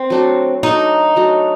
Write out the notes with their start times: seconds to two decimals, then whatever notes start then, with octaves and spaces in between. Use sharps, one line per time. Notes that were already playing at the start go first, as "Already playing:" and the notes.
Already playing: C4
0.10 F#3 A3 D4 F#4
0.63 F#3 A3 D4 D#4 F#4
1.16 F#3 A3 D4 F#4